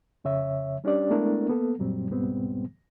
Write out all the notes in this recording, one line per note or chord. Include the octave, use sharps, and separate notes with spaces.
F2 C#3 C#5 E5
G3 C#4 D4 G4 D5
G#3 A3 B3 D4 E4 A#4
A#3 B3 A4
F#2 A#2 F#3 G3 C4
C#2 G#2 B2 G3 B3 C4